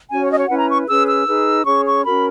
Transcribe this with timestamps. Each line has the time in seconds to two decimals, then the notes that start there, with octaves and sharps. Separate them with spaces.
0.09 C#4 F#4 C#5 G#5
0.20 C#5
0.29 D#5
0.38 C#5
0.48 C#4 E4 B4 F#5
0.58 A#5
0.68 C#6
0.87 C#4 G#4 B4 E6
1.07 E6
1.26 D#4 G#4 B4
1.65 C#4 G#4 C#5 C#6
1.85 C#6
2.04 C#4 F#4 A#4 B5